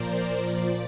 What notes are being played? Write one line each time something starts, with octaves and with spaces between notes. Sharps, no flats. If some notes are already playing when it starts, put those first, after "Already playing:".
Already playing: A#2 F3 A#4 C5 D5
A#2 F3 D5